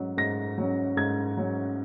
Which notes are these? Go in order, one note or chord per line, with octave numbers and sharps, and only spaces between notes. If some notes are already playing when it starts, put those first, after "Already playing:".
Already playing: G#2 F#3 C#4
G#2 A#6
F#3 C#4
G#2 G#6
F#3 C#4